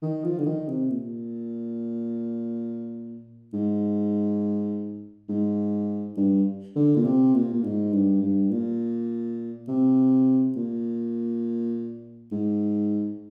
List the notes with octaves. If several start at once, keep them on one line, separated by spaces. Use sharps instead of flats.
D#3
F3
D3
D#3
C3
A#2
G#2
G#2
G2
D3
A#2
C3
A#2
A#2
G#2
G2
G2
A#2
C3
A#2
G#2